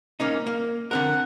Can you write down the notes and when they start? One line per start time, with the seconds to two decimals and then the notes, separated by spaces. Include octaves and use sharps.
0.20 A#3 C#4 D#4
0.47 A#3
0.91 D3 C4 A#4 F#5